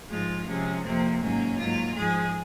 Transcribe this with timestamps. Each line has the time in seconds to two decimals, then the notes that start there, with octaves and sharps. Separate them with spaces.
0.08 G#2 F3 G#3 F4
0.46 C3 F3 G#3 C#4
0.83 F2 C3 F3 A#3 C4
1.20 G#2 F#3 A#3 C#4
1.58 G#2 F#3 A#3 F4
1.95 G#2 F3 G#3 G#4